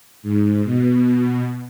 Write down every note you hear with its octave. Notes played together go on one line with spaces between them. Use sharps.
G#2
B2